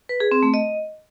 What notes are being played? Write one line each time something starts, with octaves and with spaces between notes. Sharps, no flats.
B4
G#4
C4
A3
D#5